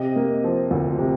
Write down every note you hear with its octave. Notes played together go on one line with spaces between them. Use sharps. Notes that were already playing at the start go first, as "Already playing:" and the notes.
Already playing: C3 D#5
A#3
F3
D2
C3